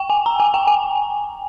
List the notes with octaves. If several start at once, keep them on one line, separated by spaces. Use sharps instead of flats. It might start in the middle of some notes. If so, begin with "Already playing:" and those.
Already playing: G5
G#5
A#5
G#5
G5
G#5